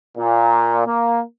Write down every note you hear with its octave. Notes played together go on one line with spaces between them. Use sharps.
A#2
A#3